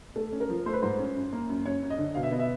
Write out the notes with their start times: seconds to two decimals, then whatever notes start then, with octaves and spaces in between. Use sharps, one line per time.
0.16 A3 A4
0.32 C#4
0.40 A#4
0.49 F3
0.66 A3 C5
0.73 B4
0.82 G#2 C5
0.99 C#4
1.16 F#2
1.32 A#3
1.49 F#2
1.65 F#2 C#5
1.82 F#2
1.90 D#5
1.98 D3
2.15 B2 F5
2.23 E5
2.31 B3 D#5
2.39 E5